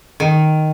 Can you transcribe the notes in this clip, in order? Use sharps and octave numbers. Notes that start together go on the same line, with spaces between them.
D#3